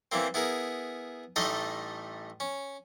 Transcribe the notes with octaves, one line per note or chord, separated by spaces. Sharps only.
E3 G3 A#3 C4
B3 E4 G#4 A#4
A1 G3 A3 D#4 D#5 C6
C#4